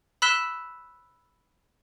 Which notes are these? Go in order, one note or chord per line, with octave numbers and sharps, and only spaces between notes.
B5 E6 F#6 B6 E7 G7